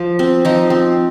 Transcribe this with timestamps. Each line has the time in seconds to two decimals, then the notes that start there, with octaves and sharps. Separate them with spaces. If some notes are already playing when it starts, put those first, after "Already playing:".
Already playing: F3
0.19 C4
0.45 F3 D#4
0.70 C4